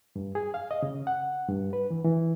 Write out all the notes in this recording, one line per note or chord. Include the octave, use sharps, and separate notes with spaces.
G2
G#4
F5
D#5
C#3
F#5
G2
B4
E3
E3